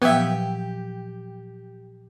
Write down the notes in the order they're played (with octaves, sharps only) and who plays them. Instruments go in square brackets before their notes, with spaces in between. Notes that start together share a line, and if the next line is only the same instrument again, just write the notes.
[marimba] A#2 F3 F#3 [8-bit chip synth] B3 E5 [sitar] G4